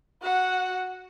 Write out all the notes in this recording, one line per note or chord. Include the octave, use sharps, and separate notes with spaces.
F#4 F#5